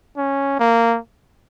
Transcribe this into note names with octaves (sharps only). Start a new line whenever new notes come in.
C#4
A#3